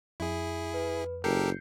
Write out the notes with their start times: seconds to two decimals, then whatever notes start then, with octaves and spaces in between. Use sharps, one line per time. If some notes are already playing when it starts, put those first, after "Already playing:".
0.20 F2 E4 G#4
0.74 B4
1.24 F#1 G4 A4 A#4 G6 C7 C#7